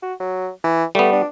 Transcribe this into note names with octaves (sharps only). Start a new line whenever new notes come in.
F#4
F#3
E3
G3 A3 B3
D4